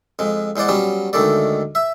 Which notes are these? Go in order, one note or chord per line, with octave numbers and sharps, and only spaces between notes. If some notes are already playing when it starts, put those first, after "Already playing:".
F2 G#3
E2 G#3 C5 D5 F#5
F#3 G3 B3 C#4
D2 D#3 G#3 A3 D5
E5